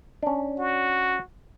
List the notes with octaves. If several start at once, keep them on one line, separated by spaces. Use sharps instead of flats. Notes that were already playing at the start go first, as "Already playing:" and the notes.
C#4 D4
F#4